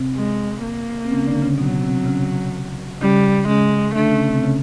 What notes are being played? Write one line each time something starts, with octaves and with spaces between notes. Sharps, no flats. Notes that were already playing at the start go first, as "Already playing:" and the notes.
Already playing: C3 C4
G#3
A#3
C4
C#3 C#4
D3 D4
C#3 C#4
B2 F#3 B3
C3 C4
C#3 C#4
C#3 G3 C#4
C#3 G#3 C#4
D3 A3 D4
C#3 C#4
C3 C4
C#3 C#4